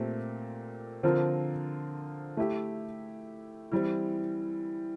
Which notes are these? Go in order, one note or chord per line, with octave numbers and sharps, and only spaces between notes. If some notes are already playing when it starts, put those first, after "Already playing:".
Already playing: A#2 A3 C4 G4
D3 F3 C4 F4 A#4
A3 E4 G4
E3 G3 C4